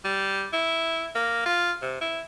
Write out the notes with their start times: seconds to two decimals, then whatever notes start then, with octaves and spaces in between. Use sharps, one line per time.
0.05 G3
0.53 E4
1.15 A#3
1.46 F4
1.82 C3
2.01 E4